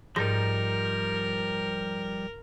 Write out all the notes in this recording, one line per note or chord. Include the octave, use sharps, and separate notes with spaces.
G#2 F3 G3 D#4 A#4 A#6